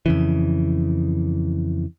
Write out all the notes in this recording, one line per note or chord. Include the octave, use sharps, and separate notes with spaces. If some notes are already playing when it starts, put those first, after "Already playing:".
F2 C#3 E3